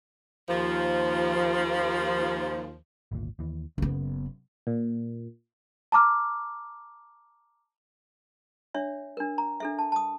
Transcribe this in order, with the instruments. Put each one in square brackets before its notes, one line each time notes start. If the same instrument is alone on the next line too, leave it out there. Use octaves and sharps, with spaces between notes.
[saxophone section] D#2 F3
[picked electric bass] G#1 D2 A#2
D#2 E3
[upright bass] F#1 B3 [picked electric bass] C#3
[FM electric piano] A#2
[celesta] A5 A#5 D6 F6
[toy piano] D4 C#5 E5
D4 A#4
A#5
D4 A4 E5
A5
A5 D#6